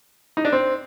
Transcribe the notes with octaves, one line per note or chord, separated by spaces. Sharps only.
D#4
D4
C4